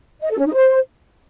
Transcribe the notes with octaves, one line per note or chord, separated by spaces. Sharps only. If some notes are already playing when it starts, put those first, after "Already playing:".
D#5
A4
C#4
D#4
C5